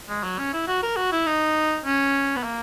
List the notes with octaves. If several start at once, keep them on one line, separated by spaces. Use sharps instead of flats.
G#3
F#3
C#4
E4
F#4
A#4
F#4
E4
D#4
C#4
B3
A#3